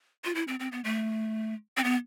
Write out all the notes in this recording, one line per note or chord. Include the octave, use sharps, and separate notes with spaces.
F4
E4
C4
C4
B3
A3
C4
B3